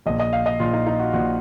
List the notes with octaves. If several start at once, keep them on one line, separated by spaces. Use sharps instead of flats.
A#1 A#2 D#5
D#5
F5
D#5
A#1 A#2 F4
D#4
D#4
F#4
A#1 A#2 F#4